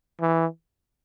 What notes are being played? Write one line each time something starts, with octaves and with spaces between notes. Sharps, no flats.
E3